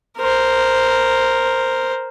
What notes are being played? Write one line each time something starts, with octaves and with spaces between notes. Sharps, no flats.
A#4 C5